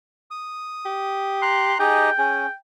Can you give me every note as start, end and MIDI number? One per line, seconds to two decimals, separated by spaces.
0.31 1.42 87
0.86 1.74 67
1.42 1.78 82
1.42 1.79 84
1.42 1.78 90
1.79 2.10 63
1.79 2.10 67
1.79 2.10 68
1.79 2.10 75
1.79 2.54 79
2.18 2.47 61
2.18 2.47 68